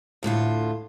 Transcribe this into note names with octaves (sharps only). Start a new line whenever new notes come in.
D2 A2 D3 F4